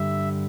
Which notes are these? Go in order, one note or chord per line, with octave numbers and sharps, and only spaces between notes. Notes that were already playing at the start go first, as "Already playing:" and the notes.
Already playing: G2 D3 G3 E5